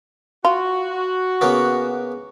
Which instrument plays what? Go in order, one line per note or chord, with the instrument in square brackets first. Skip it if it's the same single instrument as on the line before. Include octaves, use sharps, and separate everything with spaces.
[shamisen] F4 [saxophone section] F#4
[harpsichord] C#3 A#3 B3